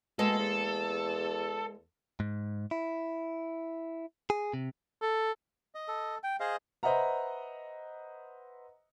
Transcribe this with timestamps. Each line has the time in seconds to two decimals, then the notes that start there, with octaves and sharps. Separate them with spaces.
0.19 B2 G#3 A#3 A4
0.39 E2
2.20 G#2
2.71 E4
4.30 G#4
4.54 C3
5.02 A4
5.75 D#5
5.88 A4
6.23 G5
6.40 G#4 C5 D#5 F5
6.83 B4 C5 D#5 E5 F#5 A#5